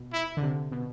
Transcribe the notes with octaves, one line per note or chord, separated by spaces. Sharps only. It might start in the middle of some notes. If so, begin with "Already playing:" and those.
Already playing: B2
E4
D3
C3
B2